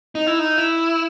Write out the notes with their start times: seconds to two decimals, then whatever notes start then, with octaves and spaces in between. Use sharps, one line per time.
0.15 D#4
0.27 E4
0.39 D#4
0.58 E4